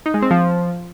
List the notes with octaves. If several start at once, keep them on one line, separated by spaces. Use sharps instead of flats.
D#4
G#3
C4
F3